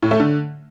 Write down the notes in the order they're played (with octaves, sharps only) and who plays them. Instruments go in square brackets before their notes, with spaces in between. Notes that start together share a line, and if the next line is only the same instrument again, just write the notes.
[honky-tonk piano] A2
A3
D3